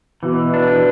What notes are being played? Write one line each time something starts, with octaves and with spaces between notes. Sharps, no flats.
B2 E3
D4